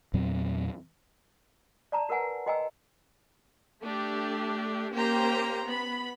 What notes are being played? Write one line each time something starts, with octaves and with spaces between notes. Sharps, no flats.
E2 A#2 F#3 C4
D5 A5 A#5
F#4 A#4 B4 F#5 G#5
F#4 D#5 G5 G#5 A#5 E6
A3 D4 G4
A#3 C#4 G4 C5 G5 A#5
B3 B5